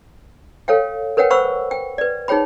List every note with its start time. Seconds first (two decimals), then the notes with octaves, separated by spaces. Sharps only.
0.68 A4 C#5 F5 G5
1.17 A#4 B4 C#5 F#5 G5
1.30 C5 F#5 B5 C#6 E6
1.71 G5
1.98 B4 D5
2.28 D#4 G#4 C#5 G5 B5